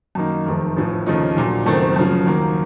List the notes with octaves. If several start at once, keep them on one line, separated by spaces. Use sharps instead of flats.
F#2 D#3 A#3 D#4
F1 F2 C3 D#3 A3
A1 A2 F3
D#2 C#3 F3 A3 D#4
A#1 A#2 F#3
F#1 F#2 D#3 A3 C4
F#2 C#3 F3
D#2 D#3 F#3 A#3